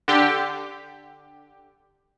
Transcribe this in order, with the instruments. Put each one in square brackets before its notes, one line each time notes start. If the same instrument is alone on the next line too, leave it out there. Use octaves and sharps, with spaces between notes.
[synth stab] D3 G4